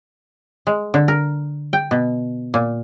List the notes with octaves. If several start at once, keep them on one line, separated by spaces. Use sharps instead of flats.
G#3
D3
A#4
G5
B2
A#2